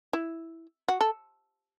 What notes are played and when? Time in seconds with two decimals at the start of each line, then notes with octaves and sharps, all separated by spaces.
0.13 E4
0.88 F#4
1.01 A4